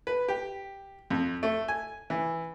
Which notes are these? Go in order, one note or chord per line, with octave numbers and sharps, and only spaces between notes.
B4
G4
F2
A3
G#5
E3